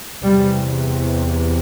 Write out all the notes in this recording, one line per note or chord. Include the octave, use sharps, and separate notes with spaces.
E2 C3 G3